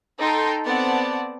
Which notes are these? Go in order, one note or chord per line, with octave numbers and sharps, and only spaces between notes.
D#4 A4 G5 C6
B3 C4 D5 F#5 A5